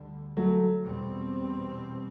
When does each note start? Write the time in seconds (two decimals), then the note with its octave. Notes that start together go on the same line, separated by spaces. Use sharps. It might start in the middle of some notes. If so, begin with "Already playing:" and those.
Already playing: D2 D3 G3
0.37 F#3 A3
0.82 E2 B2 G3 C4